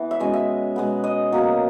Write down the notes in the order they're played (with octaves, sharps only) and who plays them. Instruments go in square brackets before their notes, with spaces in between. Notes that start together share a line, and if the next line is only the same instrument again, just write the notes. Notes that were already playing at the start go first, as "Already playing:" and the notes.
Already playing: [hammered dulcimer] E3 B3 F#5
E5
B2 G#3 C#4 D#5
E5
B2 G#3 B3
D#5
B2 F#3 A#3